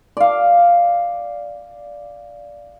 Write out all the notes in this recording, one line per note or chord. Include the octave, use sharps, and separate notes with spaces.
D5 F5